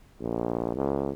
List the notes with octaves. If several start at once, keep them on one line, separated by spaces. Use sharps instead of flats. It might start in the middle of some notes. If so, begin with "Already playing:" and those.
A#1
C#2